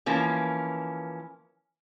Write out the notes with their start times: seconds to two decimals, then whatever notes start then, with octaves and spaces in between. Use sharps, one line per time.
0.06 E3 F3 A#3 C#4